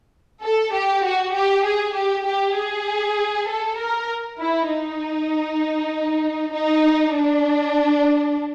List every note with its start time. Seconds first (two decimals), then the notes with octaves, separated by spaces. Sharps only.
0.43 A4
0.72 G4
1.03 F#4
1.34 G4
1.65 G#4
1.94 G4
2.25 G4
2.56 G#4
3.48 A4
3.77 A#4
4.39 E4
4.69 D#4
6.52 D#4
7.13 D4